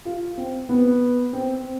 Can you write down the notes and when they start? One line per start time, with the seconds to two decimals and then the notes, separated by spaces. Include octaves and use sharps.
0.05 F4
0.38 C4
0.69 B3
1.33 C4